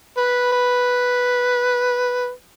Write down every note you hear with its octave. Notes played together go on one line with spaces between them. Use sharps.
B4
B4